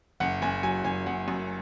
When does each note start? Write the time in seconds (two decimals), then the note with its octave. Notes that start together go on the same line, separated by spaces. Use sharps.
0.20 F#1 F#5
0.42 F#1 G#5
0.63 F#3 G#5
0.84 F#1 G#5
1.06 F#1 F#5
1.28 F#2